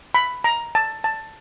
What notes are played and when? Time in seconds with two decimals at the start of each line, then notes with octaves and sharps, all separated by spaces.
0.14 B5
0.44 A#5
0.75 A5
1.04 A5